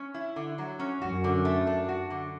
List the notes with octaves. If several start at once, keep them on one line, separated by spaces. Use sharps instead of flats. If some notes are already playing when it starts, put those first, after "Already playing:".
Already playing: C#4
E4
D3
F#3
C#4
F#2 F#4
D3
A3
D4
F#4
D3